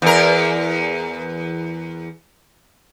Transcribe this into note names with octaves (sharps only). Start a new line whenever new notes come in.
E2 A#4